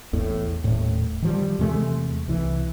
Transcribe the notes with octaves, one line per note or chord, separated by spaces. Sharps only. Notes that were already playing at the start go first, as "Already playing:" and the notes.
A1 E2 A2 A3
D#1 A2
D#3 F3 G3
E2 C3 G#3 A3
C2 E3